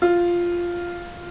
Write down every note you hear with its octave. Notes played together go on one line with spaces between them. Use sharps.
F4